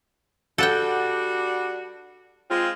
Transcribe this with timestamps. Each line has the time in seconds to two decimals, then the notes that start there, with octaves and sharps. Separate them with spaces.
0.58 G3 D4 F#4 A4 F#5 G5
2.49 G#3 C4 F4